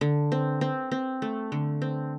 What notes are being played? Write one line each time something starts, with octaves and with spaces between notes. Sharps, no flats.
D3
C4
C4
C4
A3
D3
C4